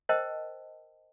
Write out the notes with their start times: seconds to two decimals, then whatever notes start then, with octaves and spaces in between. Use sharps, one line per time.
0.09 A#4 C5 D#5 G5 A5